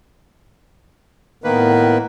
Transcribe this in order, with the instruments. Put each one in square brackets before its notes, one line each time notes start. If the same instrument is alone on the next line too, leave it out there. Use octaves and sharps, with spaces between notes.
[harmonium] A2 B3 A#4 [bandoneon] D#3 A#3 B4